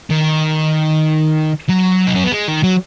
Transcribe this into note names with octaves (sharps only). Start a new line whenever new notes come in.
D#3
F#3
D#4
C#4
B3
G#3
D#3
F#3